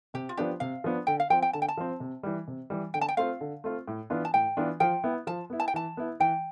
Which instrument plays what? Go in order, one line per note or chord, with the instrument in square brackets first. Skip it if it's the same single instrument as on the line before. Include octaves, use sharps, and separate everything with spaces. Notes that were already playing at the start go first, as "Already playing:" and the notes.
[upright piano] C3 [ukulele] G4
[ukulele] F4
[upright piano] F3 B3 D4 [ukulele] G4
[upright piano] C3 [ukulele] F5
[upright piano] F3 B3 D4
[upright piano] D3 [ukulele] G5
[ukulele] F5
[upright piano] F3 C4 [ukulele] G5
[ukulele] G5
[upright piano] D3 [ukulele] A5
[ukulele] G5
A5
[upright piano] F3 C4
C3
E3 G3
C3
E3 G3
[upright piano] D3 [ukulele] G5
[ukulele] A5
G5
[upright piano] A3 C4 F4 [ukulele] F5
[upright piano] D3
A3 C4 F4
A2
E3 B3 D4 F4
[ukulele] A5
[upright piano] A2 [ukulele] G5
[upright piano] E3 B3 D4 F4
[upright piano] F3 [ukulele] G5
[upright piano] B3 E4
[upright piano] F3 [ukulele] A5
[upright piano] B3 E4
[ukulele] A5
G5
[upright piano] E3 [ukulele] A5
[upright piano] B3 E4
[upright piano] E3 [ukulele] G5